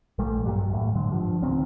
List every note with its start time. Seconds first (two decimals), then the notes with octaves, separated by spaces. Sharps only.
0.18 A#1 A#2 G3 A3
0.45 G2 F#3 G3
0.70 D#1 A2
0.95 G#2 D3 F#3
1.12 G2 F3
1.42 C#2 D#3 C4 C#4